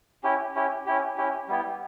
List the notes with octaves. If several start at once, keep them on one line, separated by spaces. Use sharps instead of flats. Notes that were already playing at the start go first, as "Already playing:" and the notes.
C#4 E4 G4
C#4 E4 G4
C#4 E4 G4
C#4 E4 G4
G3 B3 E4 G4